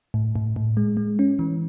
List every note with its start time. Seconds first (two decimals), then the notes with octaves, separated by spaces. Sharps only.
0.14 A2
0.36 A2
0.56 A2
0.77 G#3
0.97 G#3
1.19 C#4
1.39 E3